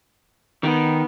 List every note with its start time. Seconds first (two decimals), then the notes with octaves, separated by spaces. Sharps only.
0.63 D#3 B3